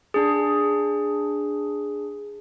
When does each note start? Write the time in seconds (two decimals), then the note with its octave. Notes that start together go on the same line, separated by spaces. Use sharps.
0.14 D4 G#4